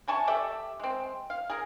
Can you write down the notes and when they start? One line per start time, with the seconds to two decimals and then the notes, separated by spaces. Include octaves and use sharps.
0.08 C3 G#5 A5 C#6
0.27 G4 A4 D5 E5
0.80 G#3 C4
1.30 F5
1.50 G#4 A#4